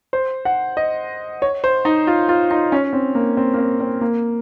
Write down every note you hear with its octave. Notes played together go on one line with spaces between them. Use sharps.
C5
F#5
D#5
C#5
C5
D#4
F4
F4
D#4
C#4
C4
A#3
C4
A#3
C4
C4
A#3